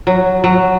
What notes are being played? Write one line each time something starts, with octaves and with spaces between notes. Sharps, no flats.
F#3
F#3